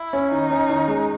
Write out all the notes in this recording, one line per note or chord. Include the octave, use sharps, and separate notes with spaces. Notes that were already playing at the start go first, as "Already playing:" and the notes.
Already playing: E4
C#4
D#3 D#4
C#4
D#3
G#3